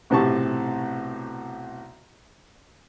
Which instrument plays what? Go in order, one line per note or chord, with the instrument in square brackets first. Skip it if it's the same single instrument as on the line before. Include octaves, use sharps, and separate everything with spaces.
[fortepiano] B1 A2 C3 G4 A5 C#6